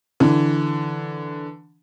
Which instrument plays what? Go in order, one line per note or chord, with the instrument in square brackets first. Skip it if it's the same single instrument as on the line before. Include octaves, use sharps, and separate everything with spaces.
[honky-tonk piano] D3 E3